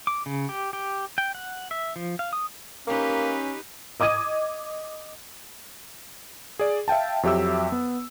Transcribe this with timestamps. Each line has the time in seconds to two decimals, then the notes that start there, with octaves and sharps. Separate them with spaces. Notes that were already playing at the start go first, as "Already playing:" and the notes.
0.07 D6
0.26 C#3
0.49 G4
0.73 G4
1.18 G5
1.35 F#5
1.71 E5
1.96 F3
2.19 F5
2.33 D#6
2.87 A#3 C#4 D#4 G4 B4
4.00 D#5 D6 D#6 G#6 D#7
6.59 G#4 D5
6.88 E5 F5 G5 A5
7.23 F2 F#3 G4 E5 E6
7.72 B3